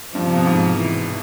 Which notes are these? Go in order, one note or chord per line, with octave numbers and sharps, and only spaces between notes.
G2 F3
C3
B2
G#2
E3